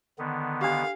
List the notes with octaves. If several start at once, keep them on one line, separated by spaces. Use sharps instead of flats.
D3 D#3 B3
D4 G4 F5